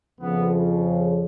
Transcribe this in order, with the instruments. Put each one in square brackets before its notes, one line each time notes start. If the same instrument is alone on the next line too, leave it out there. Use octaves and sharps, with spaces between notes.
[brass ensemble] F2 C#3 F3 B3